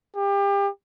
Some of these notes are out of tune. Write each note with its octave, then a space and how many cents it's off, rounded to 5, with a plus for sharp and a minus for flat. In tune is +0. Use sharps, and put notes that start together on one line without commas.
G4 +30